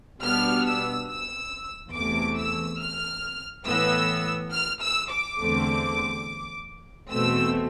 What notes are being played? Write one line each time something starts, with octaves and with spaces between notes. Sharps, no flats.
B2 G3 B3 D4 F6
E6
E6
E2 C3 E3 A3 D6
E6
F6
A2 E3 B3 E6
F6
E6
D6
E2 D3 A3 C4
E2 B2 A3 C4 E6